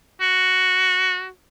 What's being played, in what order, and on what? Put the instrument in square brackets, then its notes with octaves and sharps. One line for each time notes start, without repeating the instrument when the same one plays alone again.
[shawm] F#4